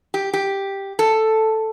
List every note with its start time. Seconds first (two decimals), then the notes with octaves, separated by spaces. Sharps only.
0.14 G4
0.33 G4
0.99 A4